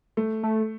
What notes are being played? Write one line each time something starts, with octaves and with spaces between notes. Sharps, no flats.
A3
A3